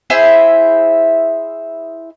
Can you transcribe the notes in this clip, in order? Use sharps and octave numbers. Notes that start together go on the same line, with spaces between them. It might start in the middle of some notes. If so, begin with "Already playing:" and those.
E4 G#4 C5 E5